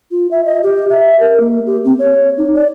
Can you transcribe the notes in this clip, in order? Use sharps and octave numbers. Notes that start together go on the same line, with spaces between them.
F4
E5
D#5
G4
E5
A#4
A#3
G4
C4
C#5
D#4
D5